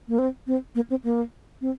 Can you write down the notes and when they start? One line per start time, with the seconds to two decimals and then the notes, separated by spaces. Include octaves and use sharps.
0.08 A#3
0.19 C4
0.47 C4
0.75 A#3
0.90 C4
1.04 A#3
1.61 C4